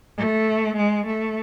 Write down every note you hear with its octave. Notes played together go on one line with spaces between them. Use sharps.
A3
G#3
A3